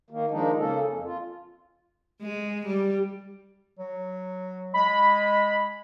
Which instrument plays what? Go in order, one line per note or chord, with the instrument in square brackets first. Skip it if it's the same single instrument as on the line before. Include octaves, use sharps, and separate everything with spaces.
[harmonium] D#3 A#3
D#3 F3 G#3 D4 D#4
C#3 A#3 C#4 A4
F2
F4
[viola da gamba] G#3
G3
[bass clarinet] F#3
[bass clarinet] G#3 [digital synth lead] B5